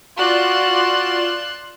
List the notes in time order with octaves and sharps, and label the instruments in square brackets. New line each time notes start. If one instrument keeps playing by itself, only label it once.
[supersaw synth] F4 D5 E7 [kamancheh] F#4 [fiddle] C6 F#6